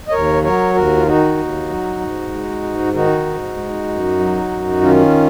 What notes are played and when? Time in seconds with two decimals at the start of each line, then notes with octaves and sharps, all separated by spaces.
0.08 D#5
0.12 D#2 A#4 C#5
0.43 F#3 A#4 C#5
0.74 D#2 F#4 A#4
0.96 F4
1.06 D#3 D#4 F#4
1.37 D#2
1.69 F#3
2.00 G#2
2.32 G#3
2.63 G#2
2.93 D#3 D#4 F#4
3.26 G#2
3.56 G#3
3.88 F#2
4.19 F#3
4.51 F#2
4.81 D#3 C#4 F4